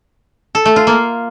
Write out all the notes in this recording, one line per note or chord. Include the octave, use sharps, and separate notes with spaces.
A4
A3
F4
A#3